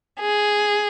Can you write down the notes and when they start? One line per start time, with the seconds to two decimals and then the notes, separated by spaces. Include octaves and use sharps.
0.20 G#4